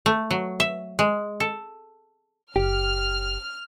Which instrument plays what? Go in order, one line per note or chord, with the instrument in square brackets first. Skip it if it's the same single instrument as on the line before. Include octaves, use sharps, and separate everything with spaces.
[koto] A3
F#3
E5
G#3
A4
[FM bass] F#1 [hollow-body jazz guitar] G4 [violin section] F6